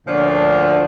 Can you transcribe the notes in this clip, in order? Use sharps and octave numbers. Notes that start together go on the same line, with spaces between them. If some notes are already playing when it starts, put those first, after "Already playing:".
D2 A#2 D3 F3 C#4 D4